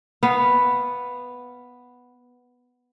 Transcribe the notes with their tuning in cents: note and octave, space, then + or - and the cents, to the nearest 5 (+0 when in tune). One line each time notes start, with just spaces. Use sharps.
B3 +0 F5 -15